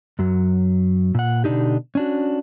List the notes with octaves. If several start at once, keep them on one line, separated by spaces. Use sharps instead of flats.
F#2 F#3
A#2 F#5
B2 D3 D4 D#4 G4
C#4 D4 F#4